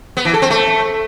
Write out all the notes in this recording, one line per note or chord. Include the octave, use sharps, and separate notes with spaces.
B3
E3
A4
C4
A3